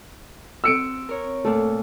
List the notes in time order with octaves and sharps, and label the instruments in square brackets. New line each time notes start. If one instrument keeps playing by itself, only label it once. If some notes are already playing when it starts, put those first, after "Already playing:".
[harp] C4 F#4 [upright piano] E6 C#7 D7
[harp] A#4 C#5
[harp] A#2 A3 [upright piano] A4